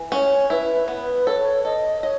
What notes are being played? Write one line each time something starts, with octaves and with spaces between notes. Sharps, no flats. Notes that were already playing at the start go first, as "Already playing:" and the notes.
Already playing: E3
C#4 C#5
E4 B4
B3 B4
A4 C#5
A4 D#5
C#5 D#5